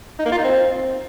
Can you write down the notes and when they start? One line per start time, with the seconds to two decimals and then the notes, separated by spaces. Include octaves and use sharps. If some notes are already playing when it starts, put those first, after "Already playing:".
0.19 D#4
0.25 A#3
0.32 F4
0.38 D#4
0.44 C4